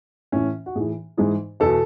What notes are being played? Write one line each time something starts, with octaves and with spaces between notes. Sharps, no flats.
A2 E3 C#4
F#4
A2 E3 G#4
G#2 E3 G#4
E2 B2 A4